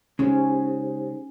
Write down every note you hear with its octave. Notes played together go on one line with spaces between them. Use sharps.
C#3 G#3 C#4 D#4 G4 C5